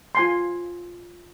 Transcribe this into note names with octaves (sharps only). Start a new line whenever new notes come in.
F4 G#5 C6